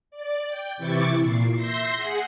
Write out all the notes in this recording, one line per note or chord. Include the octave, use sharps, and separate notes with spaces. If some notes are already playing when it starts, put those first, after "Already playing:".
D5
G5
C3 E3 E4 C#6 D6 A6
A#2 C7
E5 C6 G6 A#6 C7
G#4 F#5